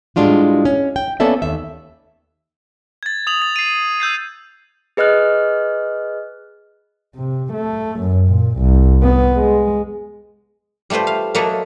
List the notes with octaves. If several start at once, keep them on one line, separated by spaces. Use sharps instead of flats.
A2 G3 G#3 D4 F4 F#4
C#4
G5
A#3 B3 C#4 A4 D5 E5
D#2 E5
G#6 A6
D#6 F7 F#7
A6
C7 D#7
E6 G6 G#6 C7
G#4 B4 D#5 F6 F#6
C3
A3
F#2
A#2
C2
B3
G#3
G3 A3 F4 B4 C5
F5
F#3 A#3 A4 B4 D#5 E5